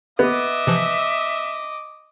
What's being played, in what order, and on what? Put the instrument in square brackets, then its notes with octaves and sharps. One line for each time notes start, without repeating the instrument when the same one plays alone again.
[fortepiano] B3 [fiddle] D#5 D6 [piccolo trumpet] E5
[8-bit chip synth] C3 E3 F3